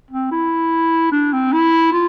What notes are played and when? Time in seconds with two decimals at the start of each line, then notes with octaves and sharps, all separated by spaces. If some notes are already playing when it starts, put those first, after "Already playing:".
0.11 C4
0.32 E4
1.12 D4
1.33 C4
1.53 E4
1.93 F4